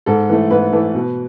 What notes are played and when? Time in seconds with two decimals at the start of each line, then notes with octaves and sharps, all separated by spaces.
0.06 G#2 A4
0.29 E3 A3
0.51 G#2 B4
0.73 E3 A3
0.94 B2